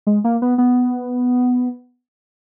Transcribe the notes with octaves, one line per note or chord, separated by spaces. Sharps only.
G#3
A#3
B3
B3